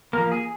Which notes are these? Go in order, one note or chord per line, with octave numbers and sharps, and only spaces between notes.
F3 A#3 A#4
G#4